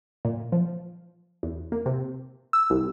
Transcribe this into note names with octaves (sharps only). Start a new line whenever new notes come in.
A#2
F3
E2
A#3
C3
E6
C2